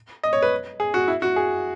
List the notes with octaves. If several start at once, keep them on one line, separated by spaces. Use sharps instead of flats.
D#5
C#5
B4
G#4
F#4
E4
F#4
G#4